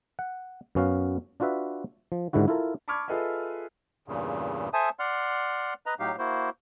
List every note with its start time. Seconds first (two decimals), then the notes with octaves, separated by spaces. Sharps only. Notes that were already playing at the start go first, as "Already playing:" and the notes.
0.19 F#5
0.75 F#2 B3 C#4 F#4 F5
1.40 D4 F4 F#4 B4 E5
2.12 F3
2.33 G#2 D3 D#3 E4 F#4
2.48 E4 F4 A4 A#4
2.88 A5 B5 C#6 D6 F6 G#6
3.08 F4 G#4 A4 B4 D#5 E5
4.08 E2 G2 A#2 C#3
4.73 A4 C5 E5 G#5 A5 D#6
4.99 D5 F#5 C6 F6
5.86 B4 D#5 A#5
5.99 A2 F#3 D#4 G4 F5
6.18 A#3 E4 F#4 C5